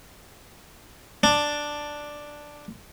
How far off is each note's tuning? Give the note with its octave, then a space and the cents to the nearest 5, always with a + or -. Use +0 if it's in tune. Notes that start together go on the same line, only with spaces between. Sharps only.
D4 +5